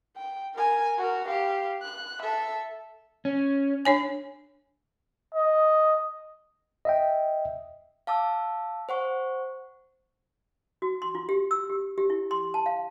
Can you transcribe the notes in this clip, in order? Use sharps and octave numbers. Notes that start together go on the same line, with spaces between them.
G5
A#4 G#5
F#4 A#4
G4 F5
F#6
A4 E5
C#4
D4 C#5 G#5
D#5
D#5 E5 G5
F5 A5 D6 E6
C5 F#5 C#6
F#4
C6
F4
G4
E6
G4
G4
E4
C6
A5
F5